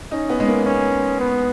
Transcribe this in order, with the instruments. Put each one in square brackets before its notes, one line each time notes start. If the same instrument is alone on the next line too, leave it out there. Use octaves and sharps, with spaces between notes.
[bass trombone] C#4 [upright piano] D#4
[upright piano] B3
G#3
A#3
[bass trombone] C#4
B3